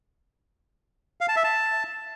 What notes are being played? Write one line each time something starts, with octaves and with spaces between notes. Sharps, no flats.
F5
A5
E5
A5